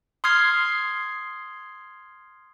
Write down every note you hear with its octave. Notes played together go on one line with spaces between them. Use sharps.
C6 D#6 F6 G#6 C7